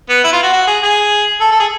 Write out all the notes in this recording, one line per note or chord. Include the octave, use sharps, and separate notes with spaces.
B3
E4
F4
F#4
F#4
G#4
G#4
A4
A4
G#4